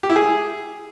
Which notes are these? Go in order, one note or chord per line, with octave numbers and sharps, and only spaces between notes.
G4
E4
G#4